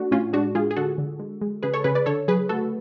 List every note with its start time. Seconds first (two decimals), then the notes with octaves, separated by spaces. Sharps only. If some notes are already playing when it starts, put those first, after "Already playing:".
Already playing: A3 D4 F#4
0.11 A2 C#4 F4
0.33 G#3 D4 F#4
0.55 G#3 F4 G#4
0.71 G#4
0.76 D3 F#4 A4
0.98 D3
1.19 G#3
1.41 G#3
1.63 C#3 G#4 B4
1.74 A4 C#5
1.84 C#3 G#4 B4
1.95 B4 D5
2.06 D3 A4 C#5
2.28 F#3 G#4 B4
2.49 A3 F#4 A4